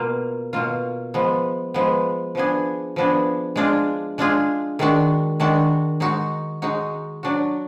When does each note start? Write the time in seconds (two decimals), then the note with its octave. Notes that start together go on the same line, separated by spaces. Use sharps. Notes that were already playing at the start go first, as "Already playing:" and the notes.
Already playing: B2 A#3 F4
0.53 B2 A#3 F4
1.14 F3 G#3 B3
1.74 F3 G#3 B3
2.35 F3 B3 D4 G#4
2.96 F3 B3 D4 G#4
3.56 G#3 D4 F4 G#4
4.18 G#3 D4 F4 G#4
4.79 D#3 G#3 D4 F#4
5.40 D#3 G#3 D4 F#4
6.00 G#3 D#4 F#4
6.62 G#3 D#4 F#4
7.23 F#3 D4 F#4